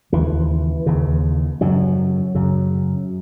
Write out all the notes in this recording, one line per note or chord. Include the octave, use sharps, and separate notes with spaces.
D#2 C#3 E3
D#2 C#3
F#2 C#3 F#3
F#2 C#3